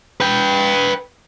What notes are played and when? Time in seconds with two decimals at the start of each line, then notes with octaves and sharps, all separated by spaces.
0.21 B4 G5